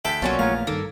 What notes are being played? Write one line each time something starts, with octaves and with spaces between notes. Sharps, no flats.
D2 A4 E5 G5 B6
B1 B2 F#3 A#3 C#4 F4 A6
A#1 E2 A3 A#3 F5 A#5 G#6
G2 D#3 A#3 A4